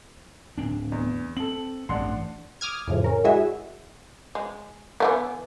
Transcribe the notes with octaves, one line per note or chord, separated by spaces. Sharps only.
D1 C4 D4
E2
C4 A4 F#7
A1 G2 D4 F#5 C6
D6 D#6 F6 G#6
F2 A2 C#3 F3
C#4 A#4
G3 G#3 E4 F#4 G#4 E5
G#3
E3 A3 B3